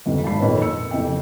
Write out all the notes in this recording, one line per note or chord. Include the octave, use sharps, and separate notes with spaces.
G1 F2 C3
G#1 A5 B5 C7
A#1 F2 D#3 B4 C#5 B5
E6 C#7
F#1 F2 C3 E5 G5